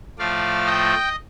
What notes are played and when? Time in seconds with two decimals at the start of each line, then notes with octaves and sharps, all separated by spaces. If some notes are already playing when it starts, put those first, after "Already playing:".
0.18 A2 F3 A3 D5 F5
0.66 D#5 G5